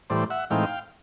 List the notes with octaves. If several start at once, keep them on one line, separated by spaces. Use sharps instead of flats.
A2 E3 G3 C5 D5
E5 F#5
A2 E3 G#3 C4 D#4 F5 G5